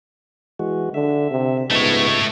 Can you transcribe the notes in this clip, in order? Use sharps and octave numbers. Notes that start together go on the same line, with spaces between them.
E3 G#3 F#4
D3 E5
C3
C#2 A3 B3 D#4 C#5